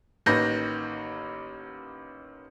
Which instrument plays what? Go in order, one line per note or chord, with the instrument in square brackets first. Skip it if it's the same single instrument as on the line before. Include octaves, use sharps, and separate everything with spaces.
[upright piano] A1 D#3 A#3 B4 G6 A#6